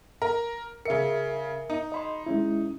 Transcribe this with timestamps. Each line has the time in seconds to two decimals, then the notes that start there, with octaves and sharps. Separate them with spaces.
0.22 A#4
0.86 C#3 A#4 E5 C#7
1.70 D#4
1.92 D#5 B5 C6
2.26 G#3 C#4 E4